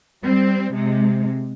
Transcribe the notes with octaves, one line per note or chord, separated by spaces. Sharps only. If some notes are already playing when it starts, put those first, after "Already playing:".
G3 C4
C3 G#3